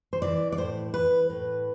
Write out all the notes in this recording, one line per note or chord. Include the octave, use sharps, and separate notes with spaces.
C5
E3 D5
D5
A2 C5
E3 B4
A2